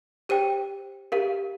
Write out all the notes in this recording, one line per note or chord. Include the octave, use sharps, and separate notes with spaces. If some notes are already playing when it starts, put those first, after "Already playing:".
G4 C5 G5 D#7
G4 A#4 F5